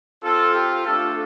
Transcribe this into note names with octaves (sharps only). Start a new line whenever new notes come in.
C4 F4 A4
G4
A3 D4 F4 A4